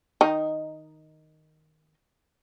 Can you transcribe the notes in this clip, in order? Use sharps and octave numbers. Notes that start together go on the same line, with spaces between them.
D#3 D#4